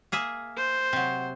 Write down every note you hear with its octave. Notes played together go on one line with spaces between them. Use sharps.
A#3 G#4 E5
C5
C3 F#3